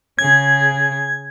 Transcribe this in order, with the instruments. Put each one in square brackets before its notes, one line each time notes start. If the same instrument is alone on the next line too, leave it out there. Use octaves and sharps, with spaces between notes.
[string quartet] C#3 G#4 [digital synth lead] G#6